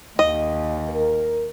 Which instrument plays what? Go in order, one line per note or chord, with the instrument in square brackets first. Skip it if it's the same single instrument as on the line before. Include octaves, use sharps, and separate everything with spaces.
[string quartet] D#2 [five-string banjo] D#5
[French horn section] A#4